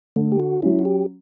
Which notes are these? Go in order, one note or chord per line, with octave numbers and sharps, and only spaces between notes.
D3 A3
G4
F#4
F#3 C#4 E4
F#4
G4